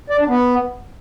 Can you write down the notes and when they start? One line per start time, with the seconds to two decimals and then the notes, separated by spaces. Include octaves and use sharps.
0.10 D5
0.19 D4
0.28 B3